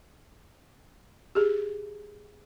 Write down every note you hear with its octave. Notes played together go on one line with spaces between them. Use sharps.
G4 G#4